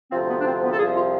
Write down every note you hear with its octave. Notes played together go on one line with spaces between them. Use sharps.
D2 C3 F3 C4
B3
D4
C4
B3
A4
C2 C3 F3 G#4
F4